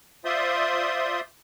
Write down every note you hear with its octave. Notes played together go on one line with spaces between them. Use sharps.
F4 C5 D5 E5 C6 D#6